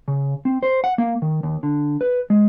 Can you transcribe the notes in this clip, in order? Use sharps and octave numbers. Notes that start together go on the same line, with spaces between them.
C#3
C4
C5
F#5
A#3
D#3
D#2
D3
B4
G#3